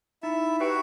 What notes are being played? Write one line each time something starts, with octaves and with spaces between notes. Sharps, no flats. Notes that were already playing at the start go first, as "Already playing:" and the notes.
D#4 E4 E5
F#4 G4 B4 E5 F#5 G5